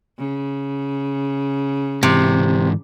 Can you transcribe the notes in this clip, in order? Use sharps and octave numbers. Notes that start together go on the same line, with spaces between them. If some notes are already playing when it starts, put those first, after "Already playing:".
C#3
G#2 C3 E3